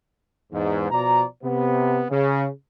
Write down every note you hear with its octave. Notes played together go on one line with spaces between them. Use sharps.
E2 G#2
B2 F3 D5 A#5
C3 B3
C#3